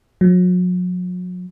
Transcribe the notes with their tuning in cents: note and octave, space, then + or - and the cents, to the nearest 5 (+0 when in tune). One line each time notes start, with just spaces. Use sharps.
F#3 -40